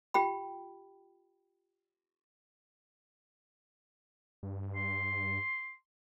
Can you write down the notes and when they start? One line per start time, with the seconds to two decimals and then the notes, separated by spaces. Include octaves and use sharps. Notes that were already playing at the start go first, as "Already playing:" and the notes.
0.14 F4 G4 G5 B5
4.43 G2
4.76 C6